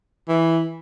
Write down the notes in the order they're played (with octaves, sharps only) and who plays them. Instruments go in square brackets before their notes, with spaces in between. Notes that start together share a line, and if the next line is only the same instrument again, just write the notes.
[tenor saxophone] E3